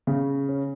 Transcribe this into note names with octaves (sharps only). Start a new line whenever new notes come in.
C#3
C#4